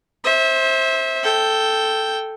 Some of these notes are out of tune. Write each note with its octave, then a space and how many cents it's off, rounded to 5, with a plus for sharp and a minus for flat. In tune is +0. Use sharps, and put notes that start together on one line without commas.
C5 +20 E5 -25
A4 +0 G5 +0